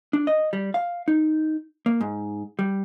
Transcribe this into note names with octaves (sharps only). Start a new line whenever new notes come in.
D4
D#5
G3
F5
D#4
A#3
G#2
G3